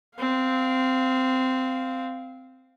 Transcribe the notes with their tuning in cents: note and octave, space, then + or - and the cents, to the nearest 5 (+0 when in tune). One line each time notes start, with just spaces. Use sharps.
C4 -15 F5 +0